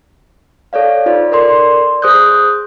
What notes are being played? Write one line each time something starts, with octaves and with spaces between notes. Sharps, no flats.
A4 C#5 D5 F5
D#4 F4 C5 D5
A4 A#4 D5 C6
G#4 C5 D#6 F#6 G6